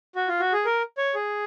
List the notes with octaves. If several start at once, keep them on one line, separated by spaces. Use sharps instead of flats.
F#4
F4
F#4
G#4
A#4
C#5
G#4